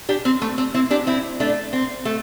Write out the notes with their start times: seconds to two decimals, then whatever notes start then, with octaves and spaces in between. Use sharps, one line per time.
0.09 D4 G4
0.25 C4
0.42 A3
0.58 C4
0.74 C4 E4
0.91 D4 G4
1.07 C4 E4
1.40 A3 D4
1.73 C4
2.05 A3